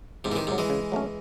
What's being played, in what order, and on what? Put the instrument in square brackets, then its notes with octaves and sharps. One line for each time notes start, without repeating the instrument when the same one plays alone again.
[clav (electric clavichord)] E2 [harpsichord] G#2 C3
[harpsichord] E3
C3 D#3
[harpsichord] G#2 C3 [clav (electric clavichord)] D#3 F#3
[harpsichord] E3 G#3
[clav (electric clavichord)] C#3
F#3 A3 C#4